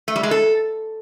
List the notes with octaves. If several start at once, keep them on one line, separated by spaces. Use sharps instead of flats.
A3
G3
G#3
A4